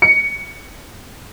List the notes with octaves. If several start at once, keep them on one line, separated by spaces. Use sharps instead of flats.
C#7